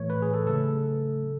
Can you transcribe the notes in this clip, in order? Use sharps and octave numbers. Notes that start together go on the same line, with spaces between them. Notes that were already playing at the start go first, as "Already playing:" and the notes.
Already playing: A2 E3 A3 C#5
B4
G#4
A4
C#3 F#3 A3 A4
C#3